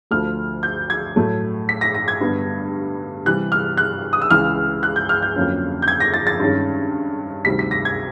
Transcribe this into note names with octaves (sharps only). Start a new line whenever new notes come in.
D2 D3 F3 A3 F6
G6
G#6
A2 F#3 A3
B6
A#6
A#6
G#6
G2 D3 G3 B3
C3 E3 G3 F#6
F6
F#6
D#6
E6
C#2 C#3 E3 F6
F#6
G6
F6
G6
F2 D3 F#3 A#3 C#4
G6
G#6
A#6
A6
A6
G2 D#3 G#3 C#4
D2 C3 D#3 G3 B6
B6
A#6
G#6